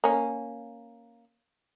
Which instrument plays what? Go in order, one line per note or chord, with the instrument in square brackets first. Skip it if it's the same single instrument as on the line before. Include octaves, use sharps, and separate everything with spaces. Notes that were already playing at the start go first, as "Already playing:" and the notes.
[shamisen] A#3 C#4